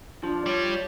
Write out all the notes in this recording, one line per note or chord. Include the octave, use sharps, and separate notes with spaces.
F3 D4
G3 C#5